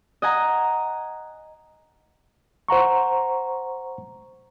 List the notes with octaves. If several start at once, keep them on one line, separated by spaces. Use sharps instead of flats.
D#5 F#5 G#5 A#5
C5 F#5 A#5 C#6